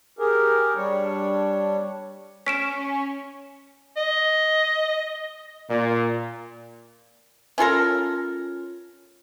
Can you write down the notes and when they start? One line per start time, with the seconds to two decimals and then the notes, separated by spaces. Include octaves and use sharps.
0.19 G4 G#4 A#4
0.76 G3 D4 C#5
2.46 C#4 B6 D7 E7
3.97 D#5
5.70 A#2
7.58 C#4 F4 A4 A#4